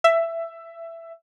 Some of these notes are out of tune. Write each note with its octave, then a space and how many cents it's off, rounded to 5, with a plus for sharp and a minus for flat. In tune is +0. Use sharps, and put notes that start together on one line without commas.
E5 +15